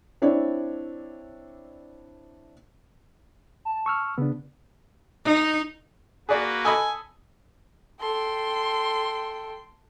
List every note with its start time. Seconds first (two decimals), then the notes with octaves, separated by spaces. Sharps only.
0.22 C4 D4 E4 C#5 D5
3.65 A5
3.86 C#6 E6 F6
4.18 C#3 B3 D4
5.25 D#4
6.29 A#3 F#4 G#4 B4 D5
6.65 A4 D#5 G#5 B5
8.00 A4 G5 C6